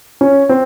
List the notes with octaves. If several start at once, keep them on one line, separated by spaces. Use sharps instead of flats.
C#4
C4